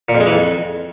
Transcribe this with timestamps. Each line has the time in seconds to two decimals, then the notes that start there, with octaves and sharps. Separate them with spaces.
0.09 A#2
0.14 F2
0.20 G#3
0.26 E3
0.32 F2